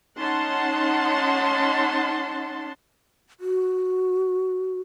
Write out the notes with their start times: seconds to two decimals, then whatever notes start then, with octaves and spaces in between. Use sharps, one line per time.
0.17 C#4 D#4 F#5 A5 C6
3.40 F#4